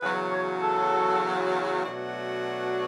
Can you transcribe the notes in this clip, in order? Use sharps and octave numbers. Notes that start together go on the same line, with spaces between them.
E2 C#3 F#3 B4
C#5
A4
B2 F#3 A3 D4 F#4